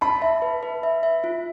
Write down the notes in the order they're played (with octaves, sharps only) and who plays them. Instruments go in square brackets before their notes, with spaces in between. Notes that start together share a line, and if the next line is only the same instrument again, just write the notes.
[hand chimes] A5 [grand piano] B5
[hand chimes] E5
B4
B4
E5
E5
F4